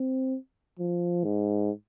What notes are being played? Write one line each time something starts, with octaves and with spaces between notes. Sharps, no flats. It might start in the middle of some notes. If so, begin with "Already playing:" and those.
Already playing: C4
F3
G#2